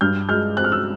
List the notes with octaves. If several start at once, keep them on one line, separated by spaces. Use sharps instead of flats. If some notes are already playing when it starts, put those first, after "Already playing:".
G2 F6 G6
G#3 F6 G6
C4 F#6
F6
E6 F#6